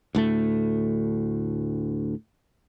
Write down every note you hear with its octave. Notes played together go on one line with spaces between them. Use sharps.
D2 A2 A3